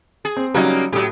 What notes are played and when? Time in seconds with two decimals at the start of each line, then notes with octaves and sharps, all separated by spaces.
0.25 G#4
0.37 C4
0.54 C#3 F#3 G3 A#3 C#4 D#4
0.92 A2 F#3 G4 D#6